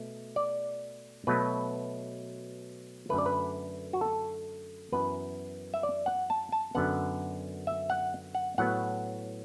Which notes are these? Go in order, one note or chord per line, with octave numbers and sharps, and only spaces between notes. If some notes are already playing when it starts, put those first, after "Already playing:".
Already playing: B2 A3
D5
B2 F#3 A3 B4
F#2 D3 A3 B4
D5
B4
F#4
A4
F#2 E3 B3 B4
E5
D5
F#5
A5
A5
F#2 D3 B3 F#5
E5
F#5
F#5
A2 F#3 B3 F#5